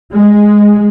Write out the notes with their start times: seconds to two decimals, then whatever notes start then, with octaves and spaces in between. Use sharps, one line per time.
0.14 G#3